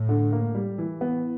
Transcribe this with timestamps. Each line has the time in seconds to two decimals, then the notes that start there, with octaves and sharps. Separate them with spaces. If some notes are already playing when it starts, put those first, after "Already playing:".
Already playing: A2
0.09 D3
0.32 A#3
0.55 G3
0.78 E3
1.01 B3